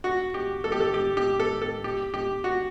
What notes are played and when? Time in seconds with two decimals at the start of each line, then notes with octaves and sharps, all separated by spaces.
0.04 F#4
0.34 G4
0.64 A4
0.72 G4
0.80 A4
0.94 G4
1.17 G4
1.40 A4
1.62 A4
1.84 G4
2.14 G4
2.44 F#4